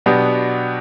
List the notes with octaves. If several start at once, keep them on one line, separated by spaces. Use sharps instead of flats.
B2 F#3 B3 D4 G4